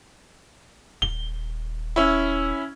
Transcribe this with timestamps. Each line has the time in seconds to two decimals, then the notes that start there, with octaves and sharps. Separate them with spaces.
1.02 D#1 G7
1.96 C#4 E4